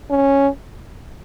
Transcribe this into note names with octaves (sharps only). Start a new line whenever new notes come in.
C#4